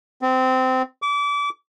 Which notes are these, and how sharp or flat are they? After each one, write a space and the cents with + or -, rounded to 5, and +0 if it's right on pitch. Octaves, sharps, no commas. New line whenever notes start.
C4 -20
D6 -30